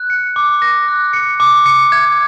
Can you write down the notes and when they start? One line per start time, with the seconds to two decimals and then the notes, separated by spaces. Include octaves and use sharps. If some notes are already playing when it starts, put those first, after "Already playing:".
Already playing: F#6
0.10 C#7
0.36 D6
0.62 A#6
0.88 F#6
1.13 C#7
1.40 D6
1.66 C#7
1.92 G#6